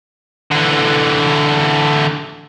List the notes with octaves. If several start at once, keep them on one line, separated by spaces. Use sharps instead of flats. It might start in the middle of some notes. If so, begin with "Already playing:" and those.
D3 E3